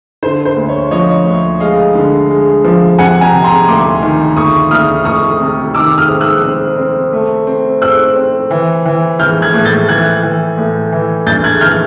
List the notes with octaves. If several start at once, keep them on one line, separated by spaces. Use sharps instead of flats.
D3 C5
C5
D2
C#5
F3 C#5 D#5
D2
G#3 D#5 F5
D3
G#3
F3
C3 F#5 G#5
G#5 A#5
C3
A#5 C6
D2 C6 D6
D#3
D2 C#6 D#6
D2 D#6 F6
D2 C#6 D#6
C3
D#3 D6 E6
D#6 F6
C4
E6 F#6
C4
C4
A3
C4
C4 E6 F#6
C4
E3
E3
E3 F6 G6
F#6 G#6
A2
G6 A6
E3 F#6 G#6
E3
A2
E3
G2 G6 A6
F#6 G#6
E3 F6 G6